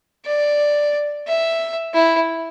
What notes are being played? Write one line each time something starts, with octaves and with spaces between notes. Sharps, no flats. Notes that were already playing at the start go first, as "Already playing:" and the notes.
D5
E5
E4